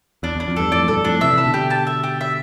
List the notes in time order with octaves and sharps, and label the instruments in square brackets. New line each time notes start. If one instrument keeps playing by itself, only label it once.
[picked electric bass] E2 [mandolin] D4
[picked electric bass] E2 [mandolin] D4
[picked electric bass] F2
[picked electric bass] E2 G2 [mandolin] A4
[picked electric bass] F2 A2 [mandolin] D5
[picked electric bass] G2 B2 [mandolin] A4
[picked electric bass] F2 A2 [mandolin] D4
[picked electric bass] C3 E3 [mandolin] E5
[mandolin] A5
[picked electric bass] B2 D3
[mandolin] G4
A5
E5
G4
E5